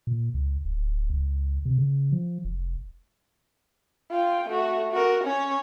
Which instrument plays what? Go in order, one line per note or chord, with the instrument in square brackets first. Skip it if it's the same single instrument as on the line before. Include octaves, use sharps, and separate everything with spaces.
[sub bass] A#2
C#2
D1
C#2
C3
C#3
F3
F1
[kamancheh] F4 G5
A3 F#4
F#4 A#4
C#4 C#5